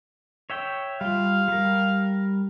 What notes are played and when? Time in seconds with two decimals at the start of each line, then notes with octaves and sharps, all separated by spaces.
0.50 C#5 E5 G5
1.01 G3 F4 F5
1.48 G3 A#4